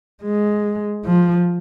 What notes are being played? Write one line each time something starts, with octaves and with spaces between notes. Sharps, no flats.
G#3
F3